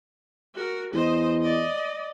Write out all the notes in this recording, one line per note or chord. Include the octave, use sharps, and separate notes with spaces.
F#4 A#4
E2 C5 D#5
D5 D#5